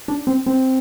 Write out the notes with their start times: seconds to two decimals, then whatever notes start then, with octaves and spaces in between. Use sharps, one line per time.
0.08 D4
0.27 C4
0.46 C4